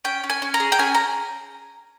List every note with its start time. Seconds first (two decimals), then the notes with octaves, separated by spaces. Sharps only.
0.05 C#4 G5
0.24 C#4
0.30 G#5
0.42 C#4
0.54 A#5
0.60 G#4
0.72 G5
0.79 C#4 G#5
0.95 A#5